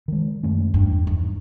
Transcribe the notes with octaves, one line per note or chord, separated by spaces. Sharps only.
D#3 G#3
F#2 A3 C#4
E2 G2
G#2